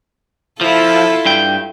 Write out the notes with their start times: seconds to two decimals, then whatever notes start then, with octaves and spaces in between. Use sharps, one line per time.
0.61 F3 E4 F4 A4
1.25 G2 G5